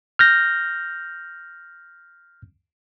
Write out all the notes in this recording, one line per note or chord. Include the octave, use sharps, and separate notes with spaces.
F6 G6 A#6